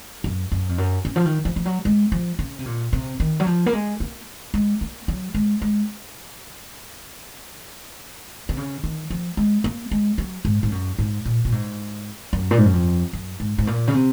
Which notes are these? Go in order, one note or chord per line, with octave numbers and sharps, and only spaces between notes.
F#2
F#2
F2
F#2
C#3
F3
D#3
F3
F3
F#3
G#3
F3
C#3
C3
A#2
C3
D#3
F#3
F3
A#3
G#3
A#3
G#3
A#3
F#3
G#3
G#3
C3
C#3
D#3
F3
G#3
A#3
G#3
F#3
G#2
G#2
F#2
G#2
A#2
A#2
G#2
F#2
A#2
G#2
F#2
F2
F#2
G#2
G#2
A#2
C#3
C3